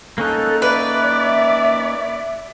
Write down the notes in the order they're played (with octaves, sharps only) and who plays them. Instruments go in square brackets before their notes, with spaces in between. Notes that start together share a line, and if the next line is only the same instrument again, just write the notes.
[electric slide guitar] A#3 C#4 D#4 [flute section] A4 F#6
[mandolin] B4 [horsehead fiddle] D5 [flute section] E5